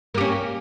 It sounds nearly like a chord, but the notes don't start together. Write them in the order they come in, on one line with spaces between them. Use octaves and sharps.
A#3 G4 C#4